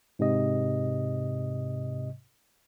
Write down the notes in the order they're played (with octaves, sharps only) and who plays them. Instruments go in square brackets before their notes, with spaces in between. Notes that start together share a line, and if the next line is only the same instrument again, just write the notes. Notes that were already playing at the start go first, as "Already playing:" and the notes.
[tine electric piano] G#2 C3 D#5